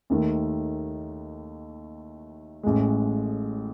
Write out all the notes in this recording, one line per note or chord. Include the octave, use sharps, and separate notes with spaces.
D#2 D#3 A3
A1 A2 G#3